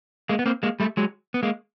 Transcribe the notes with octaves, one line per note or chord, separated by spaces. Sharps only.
G#3 A#3
B3
A#3 C4
G#3 A#3
G3 A3
F#3 G#3
B3
G#3 A#3